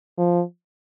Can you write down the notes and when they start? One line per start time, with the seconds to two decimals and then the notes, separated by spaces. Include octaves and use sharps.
0.18 F3